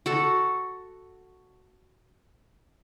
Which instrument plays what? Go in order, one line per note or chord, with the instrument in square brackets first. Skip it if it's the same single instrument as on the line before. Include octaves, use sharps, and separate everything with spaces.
[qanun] F#4 A4 A5